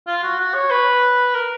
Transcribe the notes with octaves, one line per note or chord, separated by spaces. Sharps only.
F4
F#4
F#4
C#5
B4
A#4